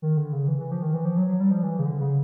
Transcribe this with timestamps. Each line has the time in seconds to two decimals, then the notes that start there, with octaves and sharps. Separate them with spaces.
0.02 D#3
0.17 D3
0.33 C#3
0.48 E3
0.59 E3
0.71 F3
0.83 D#3
0.94 E3
1.05 F3
1.17 F#3
1.28 F#3
1.40 G3
1.51 F3
1.63 E3
1.79 C#3
1.85 D3
2.01 C#3